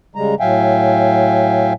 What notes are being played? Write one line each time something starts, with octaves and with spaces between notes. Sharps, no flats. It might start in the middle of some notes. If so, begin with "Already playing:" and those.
C#3 G3 G#3 A#5
A2 F#3 E5 F5 G5 G#5